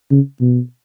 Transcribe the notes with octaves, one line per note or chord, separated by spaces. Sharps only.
C#3
B2